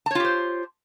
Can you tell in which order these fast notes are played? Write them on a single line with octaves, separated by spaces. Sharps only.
A5 C#5 F4 G4 C5